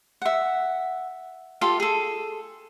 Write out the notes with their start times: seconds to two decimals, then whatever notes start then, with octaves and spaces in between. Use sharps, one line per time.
0.22 E5 F#5
1.61 F4 G4 A4 F5
1.80 G#4 A4